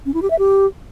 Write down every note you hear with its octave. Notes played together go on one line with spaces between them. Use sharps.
C#4
E4
G4
E5
G4